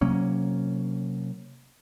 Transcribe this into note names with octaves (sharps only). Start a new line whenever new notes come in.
C3 F#3 A#3 C#4